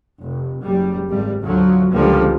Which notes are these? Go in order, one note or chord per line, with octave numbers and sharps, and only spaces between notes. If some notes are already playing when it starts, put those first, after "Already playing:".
F1
F#1 G3
G#1 G3
D2 F3 F#3
C#2 D3 F3 G3 A#3